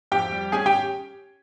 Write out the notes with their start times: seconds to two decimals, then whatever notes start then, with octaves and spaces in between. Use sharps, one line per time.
0.12 F2 G4 G5
0.32 G3
0.52 C#4 G#4 G#5
0.66 G4 G5